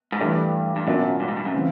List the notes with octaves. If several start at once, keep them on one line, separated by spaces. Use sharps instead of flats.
G#2
G2 E3 A3 D4 G4
G2
F#2 B2 F#3 A#3 D4 F4
G2
G#2
G2
F#2
C#3 E3 G3 C4